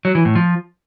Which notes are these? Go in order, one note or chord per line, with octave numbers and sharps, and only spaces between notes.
F#3
E3
A2
F3